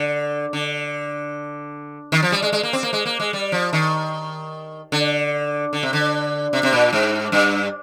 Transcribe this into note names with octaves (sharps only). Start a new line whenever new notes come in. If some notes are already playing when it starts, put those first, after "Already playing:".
Already playing: D3
D3
D#3
F3
G3
G#3
G#3
A#3
C4
A#3
G#3
A#3
G#3
G3
F3
D#3
D3
D3
C3
D3
C3
C3
A#2
G#2
G2